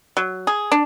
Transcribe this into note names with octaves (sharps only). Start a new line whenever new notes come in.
F#3
G#4
D4